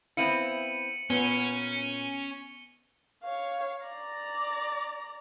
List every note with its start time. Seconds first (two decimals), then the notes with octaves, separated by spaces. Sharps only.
0.17 B3 C4 E4 F5 C#7 D#7 F#7
1.10 A#2 B3 C#4 G7
3.24 C#5 F5
3.86 D5 A#5